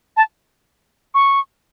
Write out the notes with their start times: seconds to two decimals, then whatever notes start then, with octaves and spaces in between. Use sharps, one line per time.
0.17 A5
1.14 C#6